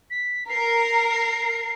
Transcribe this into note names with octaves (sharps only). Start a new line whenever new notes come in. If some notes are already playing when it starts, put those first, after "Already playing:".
B6
A#4 C7